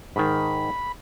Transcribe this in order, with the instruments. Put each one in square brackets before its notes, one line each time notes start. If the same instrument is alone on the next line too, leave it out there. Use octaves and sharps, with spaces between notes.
[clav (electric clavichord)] G#2 D#3 [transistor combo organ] B5